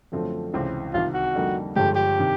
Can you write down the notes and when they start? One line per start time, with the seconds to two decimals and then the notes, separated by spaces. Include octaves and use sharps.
0.12 F#2 D3 F3 A3 C4
0.54 C#2 C3 E3 G#3 C4
0.94 C2 C3 D#3 F4
1.14 F#4
1.35 F2 D3 G3 A#3 D#4
1.76 G1 G2 D3 F3 G#3 G4
1.96 G4
2.19 C3 D#3